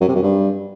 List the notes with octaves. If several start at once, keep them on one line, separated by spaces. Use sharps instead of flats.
F#2
C3
F#2
G2